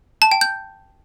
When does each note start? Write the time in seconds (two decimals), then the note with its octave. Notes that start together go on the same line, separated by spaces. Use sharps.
0.22 A5
0.32 G5
0.41 G6